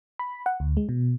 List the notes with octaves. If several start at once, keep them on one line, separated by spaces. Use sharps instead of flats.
B5
F#5
D2
G#3
B2